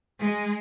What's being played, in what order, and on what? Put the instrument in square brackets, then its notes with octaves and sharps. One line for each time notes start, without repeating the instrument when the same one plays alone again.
[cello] G#3